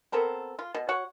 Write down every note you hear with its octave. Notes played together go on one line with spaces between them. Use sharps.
B3 C4 A4 A#4
F4
B2
F#4 C#5 F#5